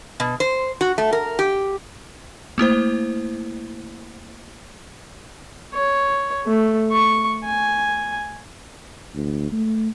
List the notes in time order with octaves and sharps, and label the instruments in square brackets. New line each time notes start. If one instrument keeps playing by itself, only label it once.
[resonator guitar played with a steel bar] B2
C5
F#4
A3
A#4
G4
[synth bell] A3 A#3 E4 C5
[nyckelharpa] C#5
A3
C#6
G#5
[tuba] D2
A3